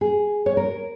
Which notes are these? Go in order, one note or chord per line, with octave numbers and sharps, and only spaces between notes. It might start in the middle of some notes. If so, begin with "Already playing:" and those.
G#4
C#5
A#4